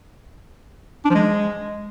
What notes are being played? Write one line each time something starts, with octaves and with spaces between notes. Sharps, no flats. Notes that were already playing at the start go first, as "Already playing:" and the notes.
D4
F3
G#3